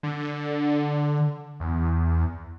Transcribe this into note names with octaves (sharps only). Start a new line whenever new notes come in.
D3
E2